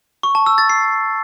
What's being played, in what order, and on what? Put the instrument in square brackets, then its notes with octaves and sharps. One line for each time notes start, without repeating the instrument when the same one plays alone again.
[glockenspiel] C#6
A5
E6
A6
C7